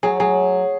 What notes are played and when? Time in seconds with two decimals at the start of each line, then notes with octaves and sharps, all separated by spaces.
0.03 F#3 G#4
0.20 F#3 G#4